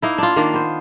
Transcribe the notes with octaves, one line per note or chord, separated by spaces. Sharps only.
A#3 D#4 E4
D4 F4
D#3 A#3 D4
B3 C5